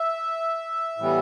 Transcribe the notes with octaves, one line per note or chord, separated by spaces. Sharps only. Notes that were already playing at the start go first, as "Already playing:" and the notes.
Already playing: E5
A2 E3 G3 B3